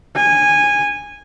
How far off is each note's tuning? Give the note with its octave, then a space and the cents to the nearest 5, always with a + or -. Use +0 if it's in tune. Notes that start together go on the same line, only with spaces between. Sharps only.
G#5 -15